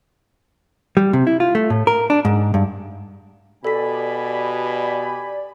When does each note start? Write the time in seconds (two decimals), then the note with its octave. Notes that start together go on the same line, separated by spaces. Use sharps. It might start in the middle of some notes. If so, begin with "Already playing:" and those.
0.97 G3
1.13 C3
1.27 E4
1.40 F4
1.55 A3
1.70 A2
1.87 A#4
2.10 D4
2.25 G#2
2.54 G2
3.64 B2 G4 A4 D5 G#5 B5 B6